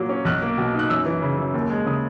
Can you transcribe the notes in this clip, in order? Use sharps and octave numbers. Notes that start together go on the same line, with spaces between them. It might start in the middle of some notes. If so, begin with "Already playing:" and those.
Already playing: A#2 F#3 A#3
C#4
B1 F#6
A#3
B2
D#4
F#6
F#2 E6
E3
C#3
F#2
D#2
G#3
C#3 D#6